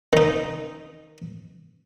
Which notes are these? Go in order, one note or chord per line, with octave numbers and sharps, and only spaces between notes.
D#3 D#4